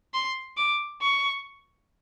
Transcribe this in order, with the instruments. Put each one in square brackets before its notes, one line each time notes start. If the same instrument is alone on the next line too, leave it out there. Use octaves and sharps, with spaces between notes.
[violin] C6
D6
C#6